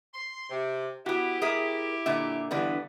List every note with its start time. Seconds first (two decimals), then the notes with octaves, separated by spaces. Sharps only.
0.14 C6
0.50 C3
1.06 B3 E4 F#4 G4
1.42 G#4 A#4 E5
2.06 A#2 D3 E5
2.51 G2 D3 E3 B3